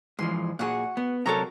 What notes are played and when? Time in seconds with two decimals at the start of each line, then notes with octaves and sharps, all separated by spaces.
0.19 G#2 E3 F3 C6
0.59 A#2 F#4 G#4 F#5
0.97 B3
1.26 C3 F#3 A4 A#4 C#5 A#5